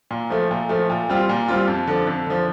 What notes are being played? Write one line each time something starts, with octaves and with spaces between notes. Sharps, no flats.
A#2
F3 A3
A#2
F3 A3
A#2
G3 C4 F4
A#2
G3 C4 F4
F2
D3 F3
F2
D3 F3